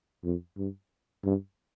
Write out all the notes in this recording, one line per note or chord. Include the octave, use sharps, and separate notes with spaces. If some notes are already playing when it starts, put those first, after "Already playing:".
F2
G2
G2